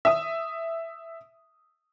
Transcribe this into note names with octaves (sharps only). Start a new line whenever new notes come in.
E5 D#6